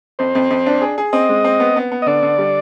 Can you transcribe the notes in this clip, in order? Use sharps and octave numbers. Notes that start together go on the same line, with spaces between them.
F2 C5
F2
F2
D4
G#4
G#4
C4 D#5
G#3
C4
B3
B3
B3
D#5
D3 D5
D3
G3